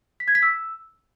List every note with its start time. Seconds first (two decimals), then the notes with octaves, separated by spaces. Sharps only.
0.20 B6
0.28 G#6
0.35 B6
0.43 E6